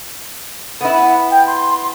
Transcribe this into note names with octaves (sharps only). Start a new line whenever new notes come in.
B3 E4 F#5
G5
C6